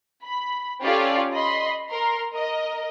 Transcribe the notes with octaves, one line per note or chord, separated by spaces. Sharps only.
B5
C#4 F4 G4 A4 C#5 D5
D#5 B5 C6
A#4 A#5 C6
A#4 D#5